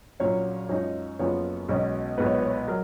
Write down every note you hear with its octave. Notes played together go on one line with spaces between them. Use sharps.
A#1 A#2 F#3 C#4 C#5
F#2 F3 G#3 D#4 C#5
F#1 F#2 F3 B3 C#5
B1 B2 G#3 C#4
B1 A#2 G#3 B3 D#4 B4
C#5
B4
C#5
B4
F#3 A#4